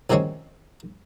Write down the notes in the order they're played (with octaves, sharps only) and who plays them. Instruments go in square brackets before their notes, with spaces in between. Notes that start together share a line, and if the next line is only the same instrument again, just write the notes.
[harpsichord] A#1 C3 D#3 G#3 C4 C#4